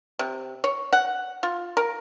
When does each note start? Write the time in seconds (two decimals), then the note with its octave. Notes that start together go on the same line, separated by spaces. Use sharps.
0.19 C3
0.64 C#5
0.93 F#5
1.43 F4
1.77 A#4